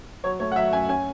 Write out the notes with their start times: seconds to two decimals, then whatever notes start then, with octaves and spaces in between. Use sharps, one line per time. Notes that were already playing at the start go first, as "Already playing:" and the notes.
0.24 F#3 C#5
0.40 A3 C#5
0.52 F#5
0.56 F#3 E5
0.72 F#2 G#5
0.89 C#4 G#5